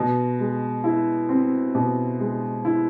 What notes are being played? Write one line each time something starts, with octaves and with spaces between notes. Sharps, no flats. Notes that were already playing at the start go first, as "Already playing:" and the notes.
Already playing: B2
G#3
E4
C4
B2
G#3
E4